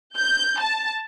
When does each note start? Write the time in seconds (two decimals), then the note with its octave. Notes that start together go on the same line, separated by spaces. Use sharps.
0.15 G6
0.59 A5